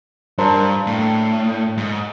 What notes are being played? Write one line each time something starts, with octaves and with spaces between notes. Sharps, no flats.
G2 D4 A#4 C5
A2
G#2